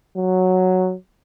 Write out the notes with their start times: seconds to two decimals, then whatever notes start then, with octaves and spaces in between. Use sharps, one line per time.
0.17 F#3